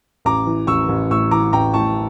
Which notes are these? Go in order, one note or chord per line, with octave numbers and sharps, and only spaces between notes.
A1 A#5 D6
E3
A1 C#6 E6
A1
A2 C#6 E6
E3 A#5 D6
A1 G5 A#5
A2 A5 C#6